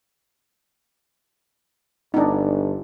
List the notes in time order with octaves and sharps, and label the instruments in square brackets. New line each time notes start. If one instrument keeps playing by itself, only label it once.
[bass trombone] G1 [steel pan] D4 D#4